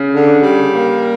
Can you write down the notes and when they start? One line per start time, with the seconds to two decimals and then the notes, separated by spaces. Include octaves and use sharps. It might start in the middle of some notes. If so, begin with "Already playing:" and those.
Already playing: C#3
0.14 D3
0.43 G3
0.72 A#3